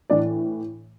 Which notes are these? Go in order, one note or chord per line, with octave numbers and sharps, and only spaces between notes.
A2 E3 D4 D5